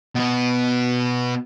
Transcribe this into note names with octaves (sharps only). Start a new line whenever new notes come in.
B2 B3